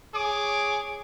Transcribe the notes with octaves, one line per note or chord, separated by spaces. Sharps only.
G#4 C#5 D6